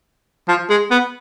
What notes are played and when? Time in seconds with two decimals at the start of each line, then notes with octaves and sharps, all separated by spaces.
0.48 F3
0.70 G#3
0.91 B3